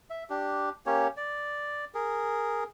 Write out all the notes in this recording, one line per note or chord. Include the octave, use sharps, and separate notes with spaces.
E5
D4 G4
A#3 C#4 G4 C#5
D5
G#4 A#4